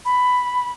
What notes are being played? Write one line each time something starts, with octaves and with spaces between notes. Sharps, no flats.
B5